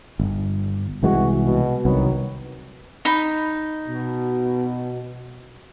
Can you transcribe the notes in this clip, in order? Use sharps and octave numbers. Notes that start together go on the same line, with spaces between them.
G1
C2 B2 E3 G#3 F#4
B2
C2 D#3 F#3 B3
D#4 B5
B2